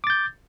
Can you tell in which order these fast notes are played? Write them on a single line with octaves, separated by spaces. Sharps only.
D6 A6 G6